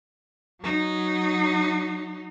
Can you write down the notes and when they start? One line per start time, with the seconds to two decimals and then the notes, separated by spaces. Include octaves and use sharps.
0.60 F#3 D#4